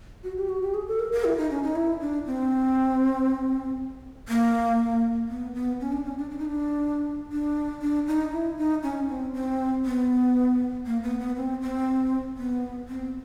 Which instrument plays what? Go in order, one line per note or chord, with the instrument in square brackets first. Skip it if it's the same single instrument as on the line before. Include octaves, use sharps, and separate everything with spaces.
[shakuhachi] F#4
G4
F#4
G4
G#4
A4
A#4
A#4
E4
D#4
C#4
D#4
E4
D4
C4
A#3
B3
B3
C#4
D4
C#4
D4
D4
D#4
D4
D4
D4
D#4
E4
D#4
C#4
C4
C4
B3
A#3
B3
B3
C4
C4
B3
C4